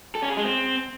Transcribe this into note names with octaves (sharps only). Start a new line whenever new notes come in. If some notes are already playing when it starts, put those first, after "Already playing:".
A4
C#4
G#4
G#3
C4